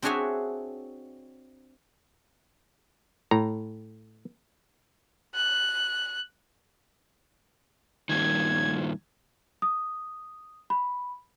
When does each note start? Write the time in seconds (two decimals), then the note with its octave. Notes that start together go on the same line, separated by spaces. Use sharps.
0.02 C4 D4 F#4 G#4 C#5 E5
3.31 A2 A#5
5.34 F#6
8.09 G2 A#2 D#3 G#6
9.62 D#6
10.70 B5